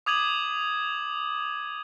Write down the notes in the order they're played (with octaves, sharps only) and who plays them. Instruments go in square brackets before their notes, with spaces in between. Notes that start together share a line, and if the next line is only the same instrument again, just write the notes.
[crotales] D6 D#6 G#6 D#7 F#7